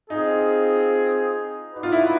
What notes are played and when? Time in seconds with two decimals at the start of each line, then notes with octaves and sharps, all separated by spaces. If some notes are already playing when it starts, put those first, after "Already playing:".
0.10 C4 D#4 F4 G#4
1.72 D#4 F#4 B4 D5
1.83 F4
1.92 E4